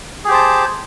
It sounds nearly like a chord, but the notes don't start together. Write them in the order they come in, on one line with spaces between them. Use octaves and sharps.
G#4 G4 C5 A5